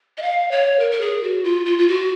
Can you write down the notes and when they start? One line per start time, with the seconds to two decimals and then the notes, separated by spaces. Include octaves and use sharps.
0.18 D#5
0.22 F5
0.51 C#5
0.79 A#4
0.91 A#4
1.01 G#4
1.23 F#4
1.44 F4
1.66 F4
1.78 F4
1.88 F#4